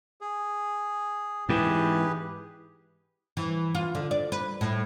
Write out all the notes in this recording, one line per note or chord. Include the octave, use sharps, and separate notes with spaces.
G#4
G#2 E3 G4 G#4 B4
E3
F4
D3
D5
B4
A2